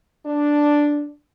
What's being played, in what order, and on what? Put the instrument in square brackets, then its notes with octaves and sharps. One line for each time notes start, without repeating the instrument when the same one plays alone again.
[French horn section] D4